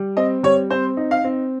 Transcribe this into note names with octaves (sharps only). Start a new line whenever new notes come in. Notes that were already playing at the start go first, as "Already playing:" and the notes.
Already playing: G3
C4 D#5
G3 C#5
C4 C5
D#4
F5
C4